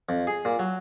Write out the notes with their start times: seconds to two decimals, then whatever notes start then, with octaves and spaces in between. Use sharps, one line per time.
0.09 F2
0.27 G#4
0.45 A#2
0.59 F#3